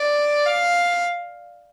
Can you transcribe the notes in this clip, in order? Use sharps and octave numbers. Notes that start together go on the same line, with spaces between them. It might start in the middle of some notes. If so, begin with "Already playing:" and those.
Already playing: D5
F5